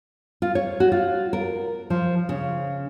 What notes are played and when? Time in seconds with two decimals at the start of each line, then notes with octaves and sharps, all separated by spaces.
0.42 F4
0.55 C#5
0.80 F#4
0.92 F4
1.33 A#4
1.90 F3
2.29 C#3